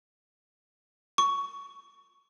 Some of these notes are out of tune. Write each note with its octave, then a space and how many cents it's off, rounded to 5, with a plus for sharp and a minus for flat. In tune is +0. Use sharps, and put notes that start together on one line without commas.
C#6 +15